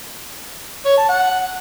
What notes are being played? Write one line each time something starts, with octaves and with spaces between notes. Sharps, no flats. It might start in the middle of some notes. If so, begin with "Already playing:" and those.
C#5
A5
F#5